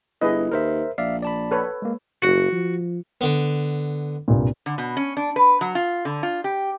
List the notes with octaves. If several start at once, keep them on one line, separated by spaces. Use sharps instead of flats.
G1 E4 G#4 B4 D#5
D#2 A#4 C5 E5
A#1 D5 E5 F5
D5 A5 B5
A4 B4 C#5
G#3 A#3
F#1 F#4
F3
D3 B3
C2 G2 A#2
D3
B2
C#4
D4
B4
F#3
F4
D3
F4
G4